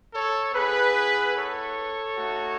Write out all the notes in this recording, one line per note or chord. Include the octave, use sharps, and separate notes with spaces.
A4 C#5
B3 E4 G#4 B4
A4 C#5
A3 D#4 F#4